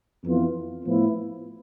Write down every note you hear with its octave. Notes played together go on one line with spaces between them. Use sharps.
F2 E3 B3 F4
A2 F3 B3 E4